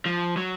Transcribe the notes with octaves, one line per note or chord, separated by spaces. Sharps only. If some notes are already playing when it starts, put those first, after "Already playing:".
F3
F#3